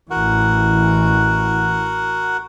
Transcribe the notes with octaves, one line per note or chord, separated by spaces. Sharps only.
A1 E3 F#4 A#4 F#5